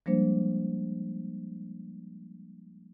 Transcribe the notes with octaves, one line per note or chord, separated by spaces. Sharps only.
F3 G3 G#3 A#3 D4 C5